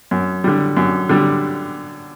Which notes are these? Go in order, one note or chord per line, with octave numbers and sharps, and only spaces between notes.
F#2
D3 G3
F#2
D3 G3